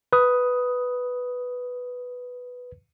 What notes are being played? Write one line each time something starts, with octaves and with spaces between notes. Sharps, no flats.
B4 D#6